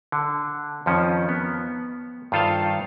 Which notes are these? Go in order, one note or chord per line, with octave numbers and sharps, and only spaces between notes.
D3
F2 D#3 F3 C#4
B3
G2 D#3 F4 A4 C5 F5